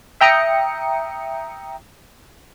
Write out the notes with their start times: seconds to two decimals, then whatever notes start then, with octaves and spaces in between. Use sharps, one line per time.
0.21 E5 G5 A#5 D#6 C#7